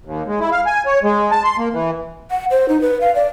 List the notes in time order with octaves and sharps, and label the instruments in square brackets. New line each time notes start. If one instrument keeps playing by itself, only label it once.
[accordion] D#2
G#3
E4
F5
G#5
C#5
G#3
A5
C6
A#3
E3
[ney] F#5
C5
D#4
B4
F5
D5